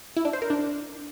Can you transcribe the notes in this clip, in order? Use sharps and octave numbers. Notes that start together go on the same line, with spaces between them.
E4
D4
C5
A#4
D4